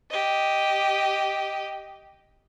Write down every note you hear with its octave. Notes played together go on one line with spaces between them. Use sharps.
G4 D#5